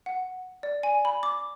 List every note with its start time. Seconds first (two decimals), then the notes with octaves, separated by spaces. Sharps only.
0.06 F#5
0.63 D5
0.83 G#5
1.05 B5
1.23 D6